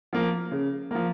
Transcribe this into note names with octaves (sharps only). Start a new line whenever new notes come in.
F3 A#3
C#3
F3 A#3